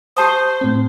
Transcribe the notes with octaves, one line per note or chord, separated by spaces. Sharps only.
G4 C5 A5 D#6
A2 C4